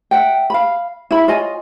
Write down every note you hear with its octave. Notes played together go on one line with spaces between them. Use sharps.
E5 F#5 G5
F5 B5
E4 E5 B5
F4 C#5 D#5 G#5